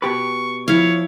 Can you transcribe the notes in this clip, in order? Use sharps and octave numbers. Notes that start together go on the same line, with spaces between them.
B2 G4 B4 C#6
F3 E4 C#5 F5